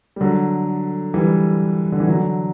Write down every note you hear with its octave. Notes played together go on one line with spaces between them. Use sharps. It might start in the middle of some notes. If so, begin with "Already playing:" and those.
G3
D3 F#3
E3 G3
D3
E3
D3 F#3